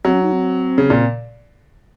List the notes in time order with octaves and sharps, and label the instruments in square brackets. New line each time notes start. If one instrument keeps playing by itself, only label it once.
[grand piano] F#3 [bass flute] C4
[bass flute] C#4
D#4
C4
[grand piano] C#3
A#2